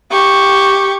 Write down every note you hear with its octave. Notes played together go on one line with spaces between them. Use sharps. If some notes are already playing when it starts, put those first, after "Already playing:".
G4 C#6